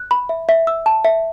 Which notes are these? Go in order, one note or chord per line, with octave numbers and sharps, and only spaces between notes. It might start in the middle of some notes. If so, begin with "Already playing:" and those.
Already playing: F#6
B5
E5
E5
E6
A5
E5